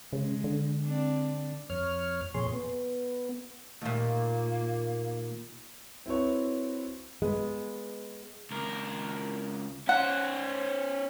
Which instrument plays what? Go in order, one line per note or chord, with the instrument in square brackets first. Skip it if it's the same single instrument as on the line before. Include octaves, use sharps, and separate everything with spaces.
[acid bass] C#3 [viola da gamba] G#3
[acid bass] D3
[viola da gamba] C4 D4
[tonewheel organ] F2 C#5 F6
F2 A#2 G#4 C#5 C6
B3
[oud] D#2 A#2 [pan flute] A#3
[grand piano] C4 E4 F#4 B4 C#5
[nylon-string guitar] G#3 B3
[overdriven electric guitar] C#2 A#4
[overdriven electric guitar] C#4 C5 [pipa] F#5